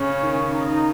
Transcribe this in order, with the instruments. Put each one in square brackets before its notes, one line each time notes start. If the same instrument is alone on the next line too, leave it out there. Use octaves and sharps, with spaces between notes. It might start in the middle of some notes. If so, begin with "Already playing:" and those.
Already playing: [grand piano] C#3 [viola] C#4
[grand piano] D#3
[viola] D#4